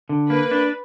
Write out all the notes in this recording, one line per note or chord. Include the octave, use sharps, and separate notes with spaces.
D3
A#3 B4
D4